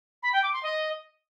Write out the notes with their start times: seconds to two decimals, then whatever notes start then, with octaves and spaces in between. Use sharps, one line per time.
0.23 B5
0.33 G5
0.43 D6
0.53 C6
0.63 D#5